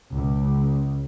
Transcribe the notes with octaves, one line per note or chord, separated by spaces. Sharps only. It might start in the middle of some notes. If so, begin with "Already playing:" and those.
C#2